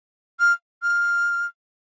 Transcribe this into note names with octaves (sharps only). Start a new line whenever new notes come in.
F6
F6